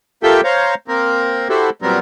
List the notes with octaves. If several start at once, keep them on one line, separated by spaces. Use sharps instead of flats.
A#3 F4 G4 A4 E5 G5
C5 C#5 F5 A#5
A#3 C4 A#4
E4 F#4 G4 A4 C5
A#2 F#3 G3 B3 C4 A#4